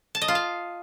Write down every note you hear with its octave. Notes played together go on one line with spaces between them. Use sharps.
A5
D#5
F4
F5